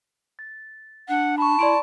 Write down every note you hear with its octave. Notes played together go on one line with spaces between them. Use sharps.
A6
D4 F#5
A5 B5 C#6
E4 D5 C6 D7